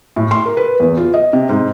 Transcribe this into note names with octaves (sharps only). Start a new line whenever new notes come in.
A2
C6
A#4
B4
E2
F4
D#5
C3
G#2